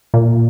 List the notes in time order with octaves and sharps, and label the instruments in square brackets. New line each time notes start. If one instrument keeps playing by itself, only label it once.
[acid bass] A#2